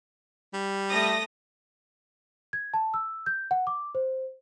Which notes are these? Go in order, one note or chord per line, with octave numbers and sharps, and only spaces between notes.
G3
A3 D#6 A#6
G#6
A5
E6
G6
F#5
D6
C5